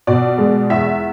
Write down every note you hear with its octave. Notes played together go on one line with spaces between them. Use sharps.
B2 D5
G#3
E2 E5